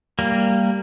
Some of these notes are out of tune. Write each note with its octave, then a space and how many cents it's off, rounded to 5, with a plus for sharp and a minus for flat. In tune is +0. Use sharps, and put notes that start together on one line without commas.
G3 +0 A#3 -15